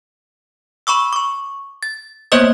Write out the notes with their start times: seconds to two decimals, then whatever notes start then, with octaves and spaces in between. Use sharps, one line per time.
0.87 B5 C#6 D6 E6
1.13 C#6 D6
1.83 A6
2.32 A#3 B3 C5 C#5 D#5 D#6